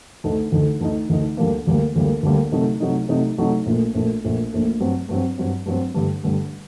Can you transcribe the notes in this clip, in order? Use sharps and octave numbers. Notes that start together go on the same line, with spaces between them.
D2 D3 A3 D#4
D2 D3 A3 D#4
D2 D3 A3 D#4
D2 D3 A3 D#4
D2 D3 G3 A#3
D2 D3 G3 A#3
D2 D3 G3 A#3
D2 D3 G3 A#3
C3 F#3 A3 D#4
C3 F#3 A3 D#4
C3 F#3 A3 D#4
C3 F#3 A3 D#4
A#1 A#2 A3
A#1 A#2 A3
A#1 A#2 A3
A#1 A#2 A3
G2 F#3 C4
G2 F#3 C4
G2 F#3 C4
G2 F#3 C4
G2 D3 G3
G2 D3 G3